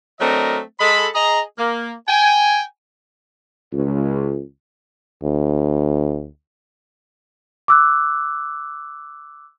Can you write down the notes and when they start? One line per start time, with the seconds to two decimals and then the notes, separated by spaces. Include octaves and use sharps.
0.21 F#3 A3 C4 D4 A#4 D#5
0.80 G#3 A4 B5
1.15 G#4 D#5 A#5
1.58 A#3
2.08 G5 G#5
3.72 C#2
5.24 D2
7.68 D6 E6 F#6